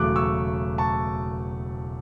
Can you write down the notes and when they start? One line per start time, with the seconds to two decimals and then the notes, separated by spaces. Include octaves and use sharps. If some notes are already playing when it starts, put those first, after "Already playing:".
Already playing: E1 E2 C#3 F#3 A3 D6 F#6
0.16 C#6 E6
0.78 A5 C#6